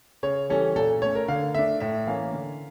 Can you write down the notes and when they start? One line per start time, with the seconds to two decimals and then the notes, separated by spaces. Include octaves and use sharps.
0.23 C#3 C#5
0.50 E3 G3 C#4 A4
0.76 A#2 A4
1.02 A3 C#4 C#5
1.15 A#4
1.28 D3 F5
1.55 A3 D4 E5
1.80 A2 E5
2.07 E3 A#3 C#4 F5
2.33 D3